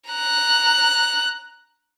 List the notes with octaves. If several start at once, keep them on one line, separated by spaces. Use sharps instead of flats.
A#5 F#6